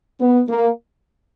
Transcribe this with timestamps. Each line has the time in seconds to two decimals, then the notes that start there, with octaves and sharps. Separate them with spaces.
0.20 B3
0.49 A#3